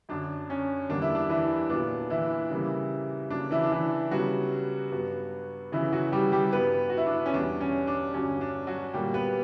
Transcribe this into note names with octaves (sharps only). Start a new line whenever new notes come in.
F#2 D3 F#3 D4
C#4
E2 D3 G3 A#3 D4
E4
D4
E3 E4
A#2 F#3 B3 D4
E3 E4
C#3 E3 G3 A#3
C#3 F#3 A#3 D4
E3 E4
D4
E3 E4
C#3 F#3 G3 B3 F#4
G2 F#3 B3
C#3 E3 F#3 B3 E4
F#3 F#4
G3 G4
G3 G4
G2 F#3 B3 B4
F#4
E4
D4
C#4
E2 B2 G3 D4
C#4
D4
G2 D3 F#3 C#4
D4
F#3 F#4
A#2 F#3 G3 A#3 G4
B3 B4